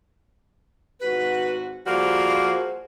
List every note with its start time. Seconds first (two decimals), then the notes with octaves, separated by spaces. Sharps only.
1.00 G#1 G#2 F#4 B4
1.86 F3 G3 A#3 F#4 G#4 C5 F6